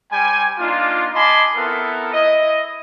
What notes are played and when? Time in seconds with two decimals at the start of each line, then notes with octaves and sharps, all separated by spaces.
0.12 G3 C5 G5 G#5
0.59 A#3 D4 D#4 F4
1.14 D#5 G#5 A5 B5 C6 D6
1.56 B3 C4 E4 A4 A#4
2.13 E4 D#5